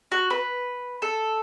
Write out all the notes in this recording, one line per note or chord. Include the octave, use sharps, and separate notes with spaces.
F#4
B4
A4